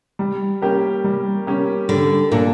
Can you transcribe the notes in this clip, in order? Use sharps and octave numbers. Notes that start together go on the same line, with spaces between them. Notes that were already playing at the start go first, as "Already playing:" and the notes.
G3
A#3 C#4 G4 A#4
G3
A#3 C#4 G4 A#4
D3 G3
A#2 D4 A4